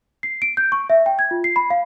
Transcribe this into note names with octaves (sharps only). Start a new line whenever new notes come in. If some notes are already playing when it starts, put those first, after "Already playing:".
C7
D7
G6
C#6
E5
G5
G#6
F4
C7
B5
F5